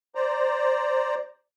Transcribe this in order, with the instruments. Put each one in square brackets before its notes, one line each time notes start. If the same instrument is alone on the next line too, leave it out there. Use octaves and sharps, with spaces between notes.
[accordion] C5 D5 A#5